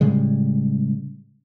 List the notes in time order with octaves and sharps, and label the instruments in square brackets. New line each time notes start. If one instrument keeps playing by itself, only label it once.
[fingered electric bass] A2 C#3 G3 G#3